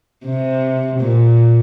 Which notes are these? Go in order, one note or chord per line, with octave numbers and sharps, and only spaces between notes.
C3
A#2